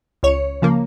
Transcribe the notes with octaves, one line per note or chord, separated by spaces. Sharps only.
C#2 C#5
C#3 F3 A#3